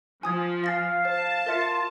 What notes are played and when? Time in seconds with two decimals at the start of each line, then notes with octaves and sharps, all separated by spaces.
0.23 F3 G#5 D#6 G#6
0.64 F5 G#5 A6 A#6
1.05 C5 A5
1.46 F4 A#4 E5 C#7